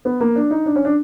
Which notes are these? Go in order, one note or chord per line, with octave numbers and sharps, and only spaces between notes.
B3
A#3
D4
D#4
D4
C#4
D4